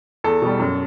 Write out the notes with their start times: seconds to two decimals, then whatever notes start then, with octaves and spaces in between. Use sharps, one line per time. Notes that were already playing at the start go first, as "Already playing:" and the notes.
0.24 E2 A4
0.42 B2 G3
0.60 F#2